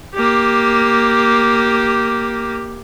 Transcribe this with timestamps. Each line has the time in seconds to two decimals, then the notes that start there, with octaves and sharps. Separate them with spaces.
0.15 A#3 G4